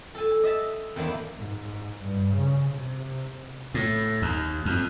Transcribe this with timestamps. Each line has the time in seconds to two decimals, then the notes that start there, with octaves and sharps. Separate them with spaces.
0.15 A4 G#5
0.43 D#5 E5 A5
0.96 E2 D#3 F3 A#3 D4 E4
1.38 G#2
2.03 G2
2.35 C#3
2.70 C3
3.74 A2
4.22 D#2
4.66 F2